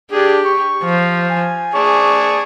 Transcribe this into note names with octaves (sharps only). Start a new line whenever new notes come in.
D4 G4 G#4
C#6
F3
G#5
G#4 D5 A5 C#6